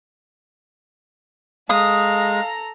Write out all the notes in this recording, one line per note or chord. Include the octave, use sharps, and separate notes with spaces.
G#3 A4 F5 A#5 D#6